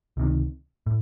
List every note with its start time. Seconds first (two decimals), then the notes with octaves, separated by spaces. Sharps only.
0.17 C#2 C3 D#3
0.86 A2